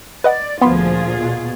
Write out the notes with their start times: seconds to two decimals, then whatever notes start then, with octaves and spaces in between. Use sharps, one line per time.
0.24 B4 D5 D#5 F#5
0.61 D2 A#2 F3 B3 F4 G#4 B5 C6
1.17 B2